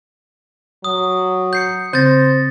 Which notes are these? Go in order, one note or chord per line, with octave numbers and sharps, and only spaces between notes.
F#3 D#6
G6 C7 C#7
C#3 C4 C5 G6 A6 A#6